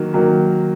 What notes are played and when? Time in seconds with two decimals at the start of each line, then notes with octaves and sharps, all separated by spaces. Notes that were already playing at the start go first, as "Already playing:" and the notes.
Already playing: D#3 F#3 A#3
0.13 D#3 F#3 A#3